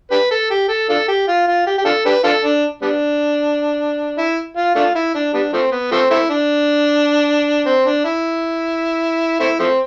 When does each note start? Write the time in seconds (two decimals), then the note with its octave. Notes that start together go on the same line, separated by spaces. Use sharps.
0.11 D4 G4 B4
0.31 A4
0.50 G4
0.69 A4
0.89 D4 F4 A4
1.08 G4
1.28 F4
1.47 F4
1.67 G4
1.79 G4
1.85 D4 F4 A4
2.05 D4 G4 B4
2.24 D4 F4 A4
2.44 D4
2.82 G3 B3 D4
4.18 E4
4.57 F4
4.75 A3 D4 F4
4.95 E4
5.15 D4
5.34 G3 B3 D4
5.53 F3 A3 C4
5.72 B3
5.92 F3 A3 C4
6.11 A3 C4 E4
6.30 D4
7.65 C4
7.86 D4
8.05 E4
9.40 A3 C4 E4
9.59 F3 A3 C4